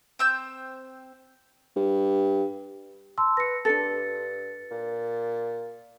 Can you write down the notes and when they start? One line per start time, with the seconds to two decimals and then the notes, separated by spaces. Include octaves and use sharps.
0.19 C4 E6 G6
1.76 G2
3.18 A5 C6 E6
3.37 B4 A#6 C#7
3.65 G2 D4 A4 A6 C#7
4.71 A#2